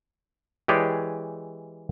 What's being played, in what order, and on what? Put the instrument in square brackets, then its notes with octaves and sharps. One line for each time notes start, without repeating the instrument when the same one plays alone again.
[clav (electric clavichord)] E3 G#3 G4 G#4 C#5 D5